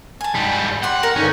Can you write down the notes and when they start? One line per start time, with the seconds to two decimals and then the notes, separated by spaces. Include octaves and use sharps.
0.21 G#5 A5
0.35 G#2 G3
0.83 G4 F#5 C6
1.03 A#4
1.16 G2 D3 C#4 D#4